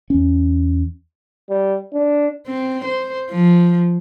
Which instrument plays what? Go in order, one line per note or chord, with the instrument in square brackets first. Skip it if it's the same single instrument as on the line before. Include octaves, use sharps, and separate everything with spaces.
[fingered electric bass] E2 C#4
[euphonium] G3
D4
[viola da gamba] C4
C5
F3